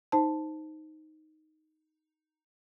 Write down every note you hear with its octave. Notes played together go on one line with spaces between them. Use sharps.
D#4 C5 A5